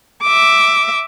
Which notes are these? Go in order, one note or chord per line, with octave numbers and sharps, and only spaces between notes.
E5 D6